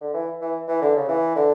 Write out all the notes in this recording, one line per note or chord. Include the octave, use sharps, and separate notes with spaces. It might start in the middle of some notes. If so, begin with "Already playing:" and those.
D3
E3
E3
E3
D3
C#3
E3
D3